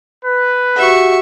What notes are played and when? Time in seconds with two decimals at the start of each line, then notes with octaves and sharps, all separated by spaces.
0.24 B4
0.76 F#4 G4 E5 F#5 C#6